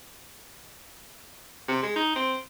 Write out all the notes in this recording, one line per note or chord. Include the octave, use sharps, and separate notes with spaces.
C3
G#3
D#4
C4